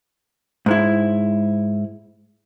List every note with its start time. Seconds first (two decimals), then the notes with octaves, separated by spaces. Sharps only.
0.66 G#2 G#3 E4